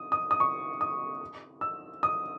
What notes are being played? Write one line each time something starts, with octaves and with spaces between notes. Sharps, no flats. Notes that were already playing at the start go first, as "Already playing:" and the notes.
Already playing: D#6
D#6
D#6
C#6
D#6
E6
D#6